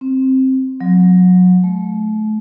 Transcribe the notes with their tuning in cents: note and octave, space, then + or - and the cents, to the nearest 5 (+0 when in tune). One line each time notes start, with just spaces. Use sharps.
C4 +10
F#3 -30
A3 -35